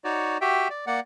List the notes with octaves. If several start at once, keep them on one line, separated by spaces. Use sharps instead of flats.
D#4 F#4 C#5 D5
F#4 G4 E5 G5
D5
A#3 D5 F#5